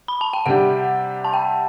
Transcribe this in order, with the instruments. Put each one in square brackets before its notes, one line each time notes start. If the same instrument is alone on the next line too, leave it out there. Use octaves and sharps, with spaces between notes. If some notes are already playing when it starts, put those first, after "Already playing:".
[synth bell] B5
A5
G5
[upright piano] C3 G3 D4 G4 [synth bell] F#5
[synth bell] A5
G5